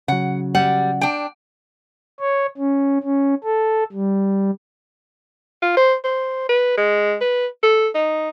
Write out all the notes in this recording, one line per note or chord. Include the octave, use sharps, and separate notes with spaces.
C#3 F#3 F#5
G3 F#5
D4 G5
C#5
C#4
C#4
A4
G3
F4
C5
C5
B4
G#3
B4
A4
D#4